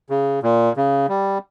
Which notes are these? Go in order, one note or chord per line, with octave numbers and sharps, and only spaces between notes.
C#3
A#2
C#3
G3